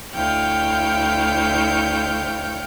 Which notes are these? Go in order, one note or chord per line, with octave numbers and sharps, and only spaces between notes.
D2 E4 C#5 F5 G5 G6